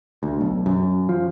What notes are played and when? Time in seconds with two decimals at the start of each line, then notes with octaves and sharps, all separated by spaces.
0.23 D2
0.41 B1
0.66 F#2
1.09 F3